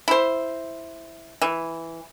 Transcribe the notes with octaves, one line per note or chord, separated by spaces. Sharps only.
E4 C5
E3